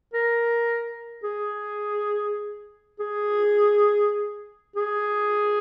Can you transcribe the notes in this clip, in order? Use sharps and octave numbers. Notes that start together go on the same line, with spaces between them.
A#4
G#4
G#4
G#4